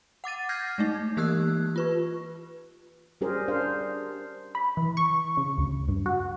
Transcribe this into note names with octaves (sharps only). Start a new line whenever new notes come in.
F#5 D6 A6 D#7
F6 G6 G#6 A#6 C7
G#3 A3 D#4
E3 A#3 G4 E6 F#6 G#6
F4 B4 C#6
G3 C#4 G4 G#4 A#4 C5
D4 C5 F5
B5
E3
C#6
C#3
D2
G2
F#4